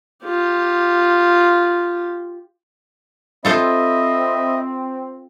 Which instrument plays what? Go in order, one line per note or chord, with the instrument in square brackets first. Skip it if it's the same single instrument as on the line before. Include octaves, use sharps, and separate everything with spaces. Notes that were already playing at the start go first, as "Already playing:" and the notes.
[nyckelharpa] F4 G4
[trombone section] C4 [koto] F4 A4 C5 [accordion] D#5 E5 B5